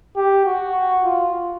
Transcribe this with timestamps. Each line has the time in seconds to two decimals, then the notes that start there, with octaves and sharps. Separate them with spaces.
0.17 G4
0.46 F#4
1.05 F4